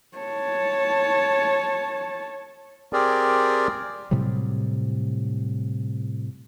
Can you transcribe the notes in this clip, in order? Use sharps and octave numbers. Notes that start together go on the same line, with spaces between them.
C#5 A5
C4 G4 G#4 A#4 D5
A2 C3 F#3 G3